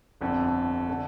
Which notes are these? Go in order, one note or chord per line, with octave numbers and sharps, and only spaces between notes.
G1 F2 D3
D3